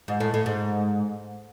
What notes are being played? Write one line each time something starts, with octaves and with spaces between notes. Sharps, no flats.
G#2
A2
A2
G#2